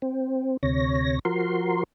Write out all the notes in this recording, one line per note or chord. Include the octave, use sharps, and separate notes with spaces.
C4
D2 C3 C#5 A#6
F3 F#4 A#4 C6